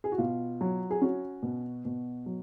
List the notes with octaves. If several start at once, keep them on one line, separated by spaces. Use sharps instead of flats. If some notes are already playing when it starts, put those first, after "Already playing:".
G#4
F#4
B2 F4
F#3
G#4
C#4 F#4
B2
B2
F#3